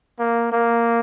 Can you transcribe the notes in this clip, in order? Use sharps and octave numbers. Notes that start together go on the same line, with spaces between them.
A#3
A#3